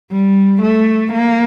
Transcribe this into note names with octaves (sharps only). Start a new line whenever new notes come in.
G3
A3
A#3